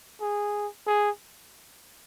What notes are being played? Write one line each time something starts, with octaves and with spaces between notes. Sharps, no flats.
G#4
G#4